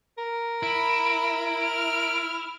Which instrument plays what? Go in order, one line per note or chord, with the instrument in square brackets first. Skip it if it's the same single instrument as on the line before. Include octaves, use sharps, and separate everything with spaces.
[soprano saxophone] A#4
[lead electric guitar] E4 [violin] B5 [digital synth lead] D7
[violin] F6